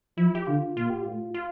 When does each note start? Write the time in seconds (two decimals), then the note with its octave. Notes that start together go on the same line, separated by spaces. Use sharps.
0.18 F3 E4
0.35 G4
0.47 D3 F4
0.77 A#2 F4
0.90 G4
1.02 A2 F4
1.34 F4